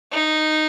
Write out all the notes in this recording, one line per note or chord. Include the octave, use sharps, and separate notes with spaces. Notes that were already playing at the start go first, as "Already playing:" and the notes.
D#4